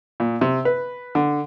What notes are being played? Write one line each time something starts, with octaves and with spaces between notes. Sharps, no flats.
A#2
C3
B4
D3